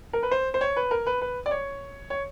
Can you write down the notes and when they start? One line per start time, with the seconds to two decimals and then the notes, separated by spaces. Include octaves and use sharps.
0.13 A#4
0.23 B4
0.31 C5
0.54 C5
0.61 C#5
0.76 B4
0.91 A#4
1.06 B4
1.22 B4
1.46 D5
1.51 C#5
2.10 C#5